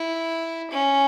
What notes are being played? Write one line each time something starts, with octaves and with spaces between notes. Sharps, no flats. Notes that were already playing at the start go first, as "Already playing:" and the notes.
Already playing: E4
C#4